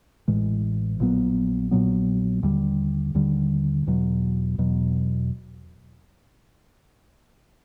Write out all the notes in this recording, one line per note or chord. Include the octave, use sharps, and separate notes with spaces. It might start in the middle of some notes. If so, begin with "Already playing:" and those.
A1 A2 E3 G#3
A#1 A#2 F#3 B3
A#1 A#2 F#3 B3
D#2 D3 G3
D#2 D3 G3
E1 E2 B2 F#3
E1 E2 B2 F#3